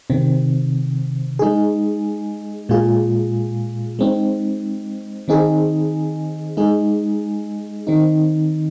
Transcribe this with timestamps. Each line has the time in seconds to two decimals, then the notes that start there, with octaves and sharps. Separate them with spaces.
0.10 C3 D#3 C4
1.39 G#3 D#4 G#4
2.69 A#2 G#3 F4 G#4
3.99 G#3 C4 D#4
5.28 D#3 C4 D#4 G#4
6.57 G#3 D#4 G#4
7.87 D#3 C4 D#4